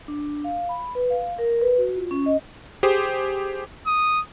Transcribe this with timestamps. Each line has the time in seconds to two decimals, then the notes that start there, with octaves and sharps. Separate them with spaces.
0.08 D4
0.44 F5
0.69 B5
0.95 B4
1.10 F5
1.39 A#4
1.61 B4
1.78 F#4
1.96 F4
2.11 C#4
2.26 D#5
2.83 G4 G#4 C5 D#6
3.87 D#6